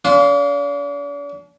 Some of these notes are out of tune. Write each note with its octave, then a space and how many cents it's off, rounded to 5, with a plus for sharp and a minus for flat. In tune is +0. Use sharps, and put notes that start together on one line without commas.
D4 -45 F5 +0 C6 +0